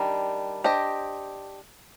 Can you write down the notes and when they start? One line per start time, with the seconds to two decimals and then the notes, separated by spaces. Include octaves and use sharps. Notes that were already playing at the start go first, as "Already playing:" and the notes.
Already playing: D#3 G3 D4
0.64 D4 G4 C5 D#5